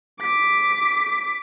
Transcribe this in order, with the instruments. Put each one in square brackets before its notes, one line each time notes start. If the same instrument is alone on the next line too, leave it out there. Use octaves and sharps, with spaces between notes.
[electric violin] D6 B6